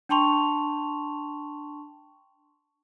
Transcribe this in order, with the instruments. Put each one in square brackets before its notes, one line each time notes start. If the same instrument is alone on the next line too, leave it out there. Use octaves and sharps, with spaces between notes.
[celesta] D4 G5 A5 C6 C#6 F7